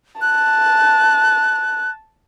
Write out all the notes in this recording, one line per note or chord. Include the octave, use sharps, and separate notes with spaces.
A5 F#6